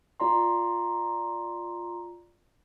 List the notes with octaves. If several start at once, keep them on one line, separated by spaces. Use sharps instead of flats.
F4 D5 A#5 C6